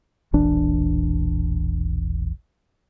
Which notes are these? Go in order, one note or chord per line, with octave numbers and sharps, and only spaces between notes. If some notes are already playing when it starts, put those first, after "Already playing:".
E1 A#1 E3 D4